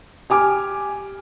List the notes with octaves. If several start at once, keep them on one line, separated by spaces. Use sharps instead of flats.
G4 G#5 D6 F6